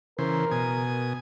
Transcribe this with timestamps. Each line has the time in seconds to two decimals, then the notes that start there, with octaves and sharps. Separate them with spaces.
0.18 C#3 E3 A#4 C5
0.51 B2 G#5 D#6